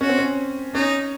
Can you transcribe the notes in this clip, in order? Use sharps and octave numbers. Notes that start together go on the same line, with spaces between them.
C#4 F#4
C4
C#4
C#4 D#4